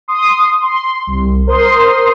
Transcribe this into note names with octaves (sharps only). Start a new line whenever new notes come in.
C6 D#6
C6
C2
A#4 C5 C6 D#6